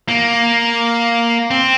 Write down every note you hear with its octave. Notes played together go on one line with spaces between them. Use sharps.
A#3
C4